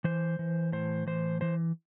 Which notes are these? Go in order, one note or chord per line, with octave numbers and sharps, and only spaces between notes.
E3 C5
E3
A2 C5
E3 C5
E3 C5